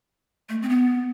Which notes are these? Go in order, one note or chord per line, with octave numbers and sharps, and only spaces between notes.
A3
C4
B3